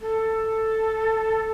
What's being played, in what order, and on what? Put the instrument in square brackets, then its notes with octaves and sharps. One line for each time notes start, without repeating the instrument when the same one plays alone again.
[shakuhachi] A4